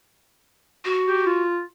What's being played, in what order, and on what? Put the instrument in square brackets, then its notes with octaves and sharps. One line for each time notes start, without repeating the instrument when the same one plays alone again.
[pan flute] F#4
[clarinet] G4
F4